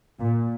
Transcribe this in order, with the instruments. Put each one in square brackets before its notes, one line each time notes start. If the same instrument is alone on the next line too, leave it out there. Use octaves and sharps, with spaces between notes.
[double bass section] A#2